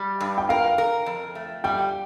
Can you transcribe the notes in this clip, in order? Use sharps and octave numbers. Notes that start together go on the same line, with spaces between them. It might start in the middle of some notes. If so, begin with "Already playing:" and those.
Already playing: G3
G2
G5
A#4 F5
A#4
F2
A3
G3 G5